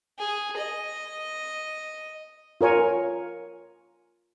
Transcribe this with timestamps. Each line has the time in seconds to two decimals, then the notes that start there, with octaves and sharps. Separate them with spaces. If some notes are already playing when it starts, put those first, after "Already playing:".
0.19 G#4
0.57 D#5
2.61 F4 A#4 C#5 G#5